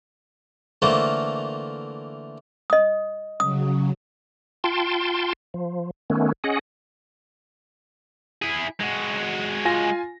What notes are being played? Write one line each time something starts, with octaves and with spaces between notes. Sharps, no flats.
D3 E3 A3 A#3 F4 C5
D#5 D#6
C#3 F#3 D#6
F4 G5 A5 C6
F3
D#3 A3 B3 C#4
C#4 G#4 D#5 F#5
E4 G#4
G#3 F#4
F4 G#5 A#6